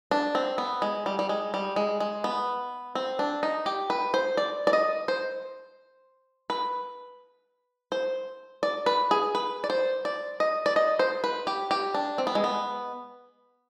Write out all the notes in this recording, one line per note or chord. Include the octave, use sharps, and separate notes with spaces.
D4
C4
B3
G#3
G3
G3
G#3
G3
G#3
G#3
B3
C4
D4
D#4
G4
B4
C5
D5
D5
D#5
C5
B4
C5
D5
B4
G#4
B4
D5
C5
D5
D#5
D5
D#5
C5
B4
G4
G4
D4
C4
B3
G#3
B3